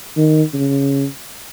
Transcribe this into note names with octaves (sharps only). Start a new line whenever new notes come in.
D#3
C#3